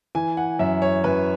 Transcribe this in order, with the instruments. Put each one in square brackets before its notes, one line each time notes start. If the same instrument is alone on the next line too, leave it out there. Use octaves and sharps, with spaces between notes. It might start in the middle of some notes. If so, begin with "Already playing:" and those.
[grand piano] E3 G#5
F#5
F#2 E5
C#5
F#2 B4